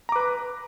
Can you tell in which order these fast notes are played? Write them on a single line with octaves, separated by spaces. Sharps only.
A#5 D6 B4